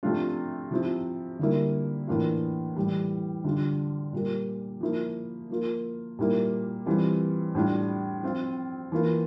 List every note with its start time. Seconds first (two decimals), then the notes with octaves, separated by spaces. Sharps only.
0.03 C3 F3 A3 D4 F4
0.71 C3 F3 C4 E4
1.39 D3 G3 A#3 E4
2.07 A2 E3 A#3 D4 F4
2.76 A2 E3 G3
3.44 D3 G3 D4 F4
4.13 A#2 G3 A#3
4.81 F3 A#3 E4
5.50 F3 A#3 F4
6.19 A#2 G3 A#3 E4
6.86 E3 G3 C4 F4
7.55 A2 G3 D4 F4
8.23 F3 C4 F4
8.92 E3 A#3 F4